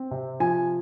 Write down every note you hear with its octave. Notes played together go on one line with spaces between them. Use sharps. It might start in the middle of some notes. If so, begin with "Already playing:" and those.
Already playing: C4
C3
F3 G#5